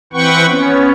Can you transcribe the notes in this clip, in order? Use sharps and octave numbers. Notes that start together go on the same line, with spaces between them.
E3 C4 B4 F#5 G5 C#6
B3 C#4